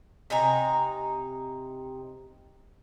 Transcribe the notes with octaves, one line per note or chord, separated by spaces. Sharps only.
C3 D#4 G#5 A#5